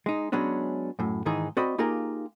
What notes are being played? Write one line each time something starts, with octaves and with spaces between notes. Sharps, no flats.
G#3 D#4
F#3 G#3 B3 C#4 D4
F#2 A2
G#2 D#3 E3 D#4 G#4
C4 F#4 D5 D#5 B5
A#3 D#4 F4 G4 G#4 A#4